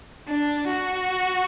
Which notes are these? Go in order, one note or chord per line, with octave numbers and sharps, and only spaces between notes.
D4
F#4